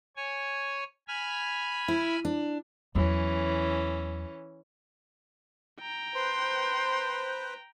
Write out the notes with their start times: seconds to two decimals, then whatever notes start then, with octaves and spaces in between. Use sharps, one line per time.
0.16 C#5 G#5
1.08 G#5 B5 F6
1.88 E4
2.25 D4
2.95 E2 E3 F#3 C#4
5.80 G5 A#5
6.15 B4 C5 C6